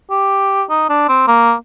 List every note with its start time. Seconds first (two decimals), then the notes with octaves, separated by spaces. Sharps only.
0.10 G4
0.70 D#4
0.89 D4
1.09 C4
1.27 A#3